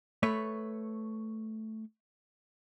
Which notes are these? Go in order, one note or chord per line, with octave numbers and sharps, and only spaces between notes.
A3 B4 C#5